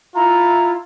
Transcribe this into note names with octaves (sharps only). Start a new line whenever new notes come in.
E4 F4 A#5